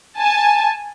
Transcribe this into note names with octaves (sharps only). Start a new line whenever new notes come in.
G#5 A5